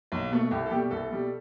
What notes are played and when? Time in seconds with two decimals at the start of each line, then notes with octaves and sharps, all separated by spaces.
0.12 B1
0.31 B2 A3
0.51 C2 G4
0.66 A4
0.70 B2 G3 G4
0.90 C2 A4
1.10 B2 G3